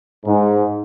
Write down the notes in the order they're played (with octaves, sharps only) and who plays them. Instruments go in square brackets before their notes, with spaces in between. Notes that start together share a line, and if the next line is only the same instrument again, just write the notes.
[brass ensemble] G#2